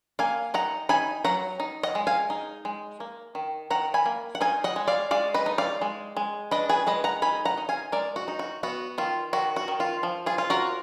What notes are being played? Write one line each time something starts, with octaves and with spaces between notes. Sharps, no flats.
A#3 F5 G#5
D#4 F#5 A#5
D#4 G#5 B5
F#3 F#5 A#5
D#4
D#5 F#5
G#3
F5 G#5
D#4
G#3
A#3
D#3
D#3 F#5 A#5
G#5 B5
A#3
F#5
D#4 F5 G#5
D#5 F#5
G#3
D5 F5
G#3 D5 F5
B4 D#5
D#4
D5 F5
G#3
G#3
D4 B4 D#5
G#4 B4
G#3 B4 D#5
F#5 A#5
D#4 G#5 B5
F#5 A#5
D#4
F5 G#5
G#3 A#4 D5
F#4
D#4
F#4
B3 F#4
D#3 F4
D#3 F#4
F#4
D#3
F4
F3
F4 G#4
F4
F#4 A#4